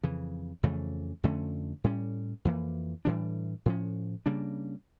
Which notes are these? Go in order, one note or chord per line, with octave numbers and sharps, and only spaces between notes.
F2 C#3 E3
F2 C#3 E3 A3
F2 D3 A3 C#4
A2 G3 C#4
F2 E3 A#3
A2 E3 G3 D4
A2 F3 C#4
C#3 G3 A#3 D4